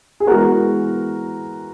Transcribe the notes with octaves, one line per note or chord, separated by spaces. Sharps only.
G#4
E3 G#3 B3 F#4 A#4